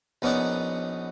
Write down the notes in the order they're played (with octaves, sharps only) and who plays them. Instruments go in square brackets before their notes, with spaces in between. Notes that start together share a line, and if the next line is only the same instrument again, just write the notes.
[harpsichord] A#1 B3 C#4 D#4 D5 F#5